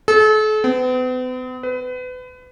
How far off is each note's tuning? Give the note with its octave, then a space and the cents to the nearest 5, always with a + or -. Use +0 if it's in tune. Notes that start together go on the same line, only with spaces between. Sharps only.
A4 -40
B3 +45
B4 +30